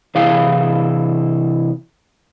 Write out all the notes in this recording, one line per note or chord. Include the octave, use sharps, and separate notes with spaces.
C3 E3 E4 G#4 F5